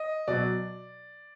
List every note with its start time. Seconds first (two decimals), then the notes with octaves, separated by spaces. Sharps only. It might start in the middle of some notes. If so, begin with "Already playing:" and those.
Already playing: D#5
0.28 B2 F#3 D5